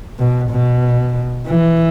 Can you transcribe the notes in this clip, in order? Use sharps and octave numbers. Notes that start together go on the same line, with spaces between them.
B2
B2
E3